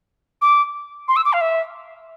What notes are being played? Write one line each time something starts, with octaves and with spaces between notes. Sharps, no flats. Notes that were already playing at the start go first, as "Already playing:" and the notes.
D6
C6
E6
D6
F5
E5